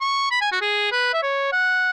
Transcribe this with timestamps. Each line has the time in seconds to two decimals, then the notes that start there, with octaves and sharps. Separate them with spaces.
0.01 C#6
0.31 B5
0.41 G#5
0.52 F#4
0.61 G#4
0.92 B4
1.13 E5
1.22 C#5
1.53 F#5